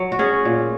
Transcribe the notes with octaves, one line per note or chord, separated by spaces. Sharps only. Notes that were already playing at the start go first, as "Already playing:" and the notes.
Already playing: F#3
F#4
C#4 G#4
A#2